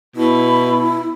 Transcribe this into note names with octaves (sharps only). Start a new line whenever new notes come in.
B2 E4